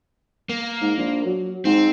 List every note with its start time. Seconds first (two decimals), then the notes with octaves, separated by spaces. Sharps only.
0.49 A#3
0.81 G#2
0.97 A#1
1.25 F#3
1.65 G#2 C4